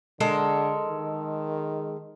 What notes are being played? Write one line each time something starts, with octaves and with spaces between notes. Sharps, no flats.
D3 G#3 A4 A#4
D#3